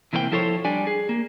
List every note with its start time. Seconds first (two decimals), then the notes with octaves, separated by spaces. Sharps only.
0.13 C3 E3 A#3 C4 B4 G5
0.32 F3 E4 A4 C5 C#5
0.65 G3 D4 D5 G#5
0.87 G#4
1.09 A#3